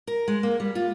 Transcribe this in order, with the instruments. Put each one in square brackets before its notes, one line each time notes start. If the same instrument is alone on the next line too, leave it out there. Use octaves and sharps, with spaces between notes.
[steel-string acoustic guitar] A#4
G#3
A#3
G3
F4